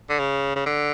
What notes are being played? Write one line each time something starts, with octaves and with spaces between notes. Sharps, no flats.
D3
C#3
C#3
D3